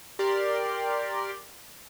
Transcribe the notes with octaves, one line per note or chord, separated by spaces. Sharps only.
G4 A#4 D5 C6